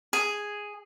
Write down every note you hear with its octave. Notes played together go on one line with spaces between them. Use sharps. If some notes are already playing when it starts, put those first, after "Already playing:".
G#4